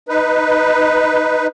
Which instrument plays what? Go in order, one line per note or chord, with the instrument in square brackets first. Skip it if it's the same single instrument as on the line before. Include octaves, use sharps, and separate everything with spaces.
[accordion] D#4 B4